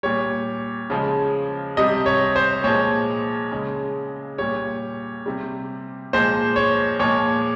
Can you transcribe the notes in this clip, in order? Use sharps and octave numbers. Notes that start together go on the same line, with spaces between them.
A#2 G3 C#5
C#3 F3 G#3
C3 G3 D#5
C#5
C5
A#2 F3 G#3 C#5
C#3 G#3
A#2 G3 C#5
C3 G3
A#2 F3 G#3 C5
C#5
A#2 F3 G#3 C#5